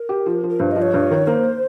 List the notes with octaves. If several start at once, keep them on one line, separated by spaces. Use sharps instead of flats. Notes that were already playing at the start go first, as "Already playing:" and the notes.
Already playing: A#4
G4
F3
F3
A#4
G2 C5
F3 D#5
C#5
G2
D#3
A#3 C5